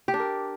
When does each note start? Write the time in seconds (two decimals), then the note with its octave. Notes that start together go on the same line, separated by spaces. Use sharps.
0.08 G4
0.14 D4
0.19 A#4